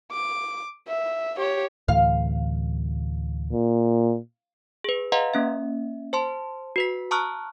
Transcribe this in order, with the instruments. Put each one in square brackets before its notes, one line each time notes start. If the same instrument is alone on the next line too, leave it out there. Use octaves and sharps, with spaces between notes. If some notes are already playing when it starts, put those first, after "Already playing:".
[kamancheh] D6
E5
G4 C#5
[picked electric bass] D2 A2 E3 [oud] F5
[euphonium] A#2
[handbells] G#4 B4
B4 D#5 F5 F#5 A#5 C6
A#3 C#4 E5
C5 A5 C6
F#4 B4 B6
A5 A#5 C#6 D#6 F6 F#6